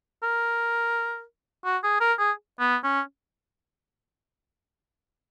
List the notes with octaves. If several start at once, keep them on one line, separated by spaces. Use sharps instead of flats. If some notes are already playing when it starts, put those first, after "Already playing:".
A#4
F#4
G#4
A#4
G#4
B3
C#4